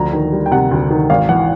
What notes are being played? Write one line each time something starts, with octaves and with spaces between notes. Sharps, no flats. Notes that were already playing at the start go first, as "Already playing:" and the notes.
Already playing: D2 F3 A#5
D#3
G3
G5
C3 F#5
D2
D#3
G#1 F5
E3 F#5